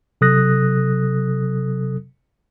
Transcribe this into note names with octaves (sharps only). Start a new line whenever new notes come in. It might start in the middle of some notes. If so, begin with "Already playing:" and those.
C3 F#3 A4 D#6 F#6 A#6